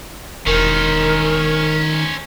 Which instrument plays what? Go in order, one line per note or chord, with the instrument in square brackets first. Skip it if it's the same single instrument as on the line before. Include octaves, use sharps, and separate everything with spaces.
[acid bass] E1 [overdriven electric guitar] D#3 [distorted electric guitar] C#4 C5 [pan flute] A#4